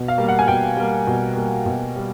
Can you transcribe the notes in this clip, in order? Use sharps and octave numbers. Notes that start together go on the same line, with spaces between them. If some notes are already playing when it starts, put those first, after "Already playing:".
Already playing: B2
F5
G3 A#3
F#5
G#5
B2 G5
G3 A#3
B2
G3 A#3
B2
G3